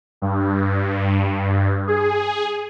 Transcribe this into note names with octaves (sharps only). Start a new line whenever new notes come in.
G2
G#4